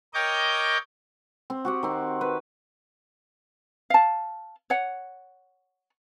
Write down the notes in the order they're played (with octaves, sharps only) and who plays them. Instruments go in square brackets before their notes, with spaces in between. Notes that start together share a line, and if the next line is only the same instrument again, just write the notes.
[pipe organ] A#4 C#5 D#5 G5 D6 G6
[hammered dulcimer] C4
F#4 G4 F#5
D#3 C4
B4
[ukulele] F5 A5
C#5 F#5